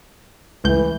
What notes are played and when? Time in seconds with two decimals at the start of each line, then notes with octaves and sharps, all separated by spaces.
0.64 C#2 A2 E3 G6